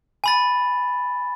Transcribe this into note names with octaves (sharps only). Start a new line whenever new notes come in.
G#5 B5 A6